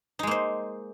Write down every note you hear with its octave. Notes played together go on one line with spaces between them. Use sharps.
G#3 A#3 D#4 C5